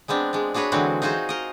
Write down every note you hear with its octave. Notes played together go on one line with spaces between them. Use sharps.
G#3 B3 C4 D4
G#3 D4
D4 F#4 G#4 B4 C#5
D3 E3 F#3 G#3 C4 F#4
D#4 F4 F#4 G#4 C5
A#4 D#5